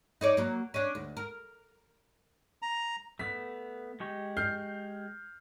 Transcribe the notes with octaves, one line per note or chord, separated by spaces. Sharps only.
D#4 C#5 D5
F#3 A#3
C#4 D4
D2
A#4
A#5
A3 B3 B6
G#3 G4 C#6
F6 G6 C7